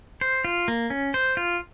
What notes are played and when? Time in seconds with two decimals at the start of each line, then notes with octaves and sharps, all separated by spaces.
0.21 C5
0.44 F4
0.68 A#3
0.90 C#4
1.14 C5
1.37 F4